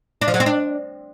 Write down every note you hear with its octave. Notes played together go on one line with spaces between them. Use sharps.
D4
F3
F#3
C4
D4